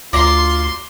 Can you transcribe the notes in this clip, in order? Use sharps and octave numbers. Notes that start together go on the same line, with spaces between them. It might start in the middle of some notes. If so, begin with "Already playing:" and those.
D2 F4 D5 A#5 C6